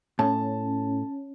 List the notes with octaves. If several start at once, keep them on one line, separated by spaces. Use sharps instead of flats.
A2 C#4 A5